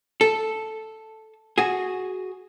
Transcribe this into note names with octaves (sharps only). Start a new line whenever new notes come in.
A4
F#4 G#4